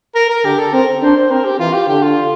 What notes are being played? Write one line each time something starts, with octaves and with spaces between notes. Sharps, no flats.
A#4
A#4
D3 G4
A4
C4 A#4
D4 C5
C5
C4 A#4
G4
E3 F4
G4
D3 G4
F4